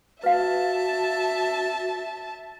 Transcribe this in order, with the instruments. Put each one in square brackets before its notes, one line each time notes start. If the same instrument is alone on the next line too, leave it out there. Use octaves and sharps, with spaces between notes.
[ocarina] F#4 [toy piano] B4 F5 [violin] E5 A5